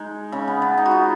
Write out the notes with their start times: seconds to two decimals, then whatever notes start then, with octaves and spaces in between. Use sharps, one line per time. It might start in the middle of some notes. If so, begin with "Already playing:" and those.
Already playing: G#3 D#4
0.32 C#3
0.48 B3
0.62 B3
0.78 D#4
0.86 F#4
0.91 F4